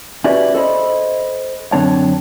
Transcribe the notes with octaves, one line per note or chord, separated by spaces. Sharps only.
C#4 E4 F#4 G4 B4 D5
A4 C5 D#5 B5
F#2 D3 C4 D4 C#5 A5